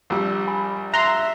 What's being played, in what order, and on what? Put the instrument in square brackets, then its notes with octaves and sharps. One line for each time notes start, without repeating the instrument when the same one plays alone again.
[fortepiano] A#1 G3 [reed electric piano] E6
[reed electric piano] G#5 B5
[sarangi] E5 [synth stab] A#5 C6 [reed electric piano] F#6